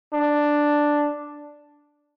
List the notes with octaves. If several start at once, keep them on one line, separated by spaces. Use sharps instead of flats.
D4